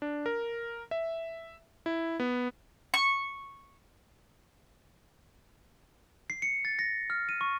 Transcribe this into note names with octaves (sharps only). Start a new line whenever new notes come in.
D4
A#4
E5
E4
B3
C#6
C7
C#7
A6
A#6
F6
D#7
C#6